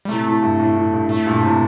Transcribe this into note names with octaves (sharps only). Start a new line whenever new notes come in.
G3
A2 C3 A3
A2
G2
A2
A2
G2
A2 A3
G2 A#2
A#2
A2 C3